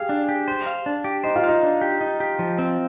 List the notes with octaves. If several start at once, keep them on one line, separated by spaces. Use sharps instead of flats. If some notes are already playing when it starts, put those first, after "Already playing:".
Already playing: G4 G#4 F5
D4
G4
C5
F5
D4
G4
D#4 C5
F4
D#4 F5
D4
G4
D#4
G4
F3
C4